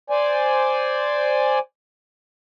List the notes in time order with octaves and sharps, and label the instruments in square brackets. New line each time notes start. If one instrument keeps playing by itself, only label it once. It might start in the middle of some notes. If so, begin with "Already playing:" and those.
[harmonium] C5 D5 G#5